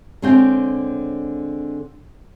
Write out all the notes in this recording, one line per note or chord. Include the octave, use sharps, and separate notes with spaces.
D3 G#3 C4 C#5 G5